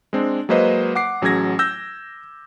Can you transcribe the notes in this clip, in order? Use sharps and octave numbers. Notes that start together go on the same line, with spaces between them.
G#3 C4 D4
F#3 G#3 A#3 B4 C5 D#5
F#5 D6 C7
A1 F#3 C#4 G#4 G#6 A#6
E6 G6 A#6